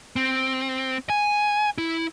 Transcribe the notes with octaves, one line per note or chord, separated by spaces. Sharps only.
C4
G#5
E4